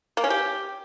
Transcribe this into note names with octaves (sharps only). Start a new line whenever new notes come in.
A#3
C#4
G4